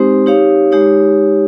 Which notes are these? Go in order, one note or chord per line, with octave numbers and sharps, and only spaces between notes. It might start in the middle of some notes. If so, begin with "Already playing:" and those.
Already playing: G#3 C4 D#4 G4 C5
D#4 G4 C#5 F5
G#3 D#4 G4 C#5